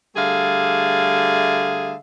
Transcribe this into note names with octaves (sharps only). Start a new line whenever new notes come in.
D3 G3 A3 G#4 E5 F5